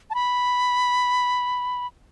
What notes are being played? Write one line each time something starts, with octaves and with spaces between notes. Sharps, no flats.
A5
B5